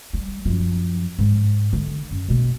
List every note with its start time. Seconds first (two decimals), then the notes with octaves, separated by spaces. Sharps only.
0.13 G3
0.45 F#2 F3
1.18 G#2
1.73 D3
2.11 F#2
2.28 B2 A#3